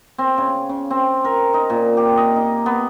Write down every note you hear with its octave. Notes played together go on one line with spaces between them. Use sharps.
C4
C#3
C#3
C4
A#4
D#4
A#2
G4
D#5
D#4
B3